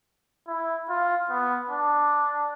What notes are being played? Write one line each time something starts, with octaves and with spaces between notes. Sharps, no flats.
E4
F4
B3
D4